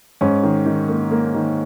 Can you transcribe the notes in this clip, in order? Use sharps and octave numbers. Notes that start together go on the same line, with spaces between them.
G#2 C#4
D#3
D#3
A#3
A#3
D#3